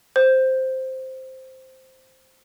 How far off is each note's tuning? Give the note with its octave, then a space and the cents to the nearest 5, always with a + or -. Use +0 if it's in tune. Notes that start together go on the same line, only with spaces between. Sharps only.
C5 +0